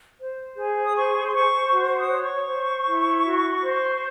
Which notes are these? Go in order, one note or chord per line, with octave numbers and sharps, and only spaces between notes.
C5
G#4
D#6
C5 C#6
C6
C5 C#6
F#4
D#6
C#5
C#6
C5
E4
F#4
C5